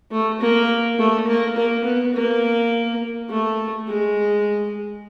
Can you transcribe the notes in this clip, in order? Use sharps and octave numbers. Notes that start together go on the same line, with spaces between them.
A3
A#3
A3
A#3
A#3
B3
A#3
A3
G#3